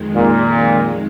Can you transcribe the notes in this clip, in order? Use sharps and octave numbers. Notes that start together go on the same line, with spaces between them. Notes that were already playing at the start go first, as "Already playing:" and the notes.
Already playing: F2 D#3 G#3
A#2